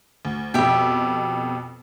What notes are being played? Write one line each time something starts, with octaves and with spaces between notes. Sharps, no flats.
D2
F2 B2 G4 E5 G5